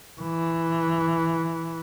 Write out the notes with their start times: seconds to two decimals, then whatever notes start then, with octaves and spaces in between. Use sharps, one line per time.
0.21 E3